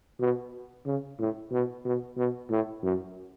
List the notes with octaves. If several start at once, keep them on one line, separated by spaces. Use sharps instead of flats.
B2
C#3
A2
B2
B2
B2
A2
F#2